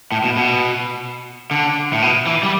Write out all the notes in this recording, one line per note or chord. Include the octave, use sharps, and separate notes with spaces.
A2
B2
B2
D3
A2
B2
E3
G3